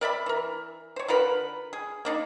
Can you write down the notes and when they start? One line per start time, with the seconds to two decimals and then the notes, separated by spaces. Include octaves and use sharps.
0.01 A#4 D5 E5 B5
0.26 E3 A#4
0.96 C5 C#5
1.08 D3 F4 A#4 B4
1.73 G#4
2.05 A#3 D4 D#4